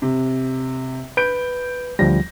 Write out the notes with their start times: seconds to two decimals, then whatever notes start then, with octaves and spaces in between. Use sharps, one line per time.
0.02 C3
1.17 B4 G6 D7
1.99 D2 F3 G3 A#6